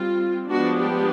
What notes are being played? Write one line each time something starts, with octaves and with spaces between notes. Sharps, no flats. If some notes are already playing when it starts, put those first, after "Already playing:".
Already playing: G3 C4 F4
F3 G#3 B3 D4 F#4
G4